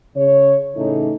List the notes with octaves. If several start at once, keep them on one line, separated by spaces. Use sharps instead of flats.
C#3 C#5
A2 C#3 E3 A3 D#4